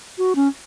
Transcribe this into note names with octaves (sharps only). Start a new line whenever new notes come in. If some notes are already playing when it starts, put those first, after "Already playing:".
F#4
C#4